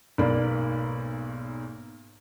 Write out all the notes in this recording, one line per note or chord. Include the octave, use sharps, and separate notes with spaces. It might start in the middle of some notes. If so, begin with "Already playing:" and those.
B1 G#2 A#3 D5 B5